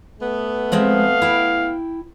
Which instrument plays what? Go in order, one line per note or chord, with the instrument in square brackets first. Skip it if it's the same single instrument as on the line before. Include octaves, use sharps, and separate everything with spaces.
[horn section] A3 B3
[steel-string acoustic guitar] F3 G#3 C4 [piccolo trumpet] F5
[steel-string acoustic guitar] E4 G5